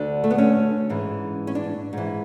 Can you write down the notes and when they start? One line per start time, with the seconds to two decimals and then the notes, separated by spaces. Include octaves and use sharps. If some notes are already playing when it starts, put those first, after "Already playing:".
Already playing: D2 D3 D4
0.24 A3
0.30 B3
0.38 C#4
0.90 G#2 E3
1.47 C#4
1.55 D4
1.93 G#2 E3